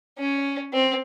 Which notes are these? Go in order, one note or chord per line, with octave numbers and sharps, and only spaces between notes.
C#4
C4